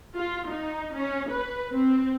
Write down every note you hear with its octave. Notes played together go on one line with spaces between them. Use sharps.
F4
D#4
C#4
B4
C4